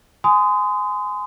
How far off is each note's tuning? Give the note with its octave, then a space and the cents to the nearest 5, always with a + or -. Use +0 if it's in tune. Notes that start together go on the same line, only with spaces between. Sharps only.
G#5 +10 C6 -35 D#6 +0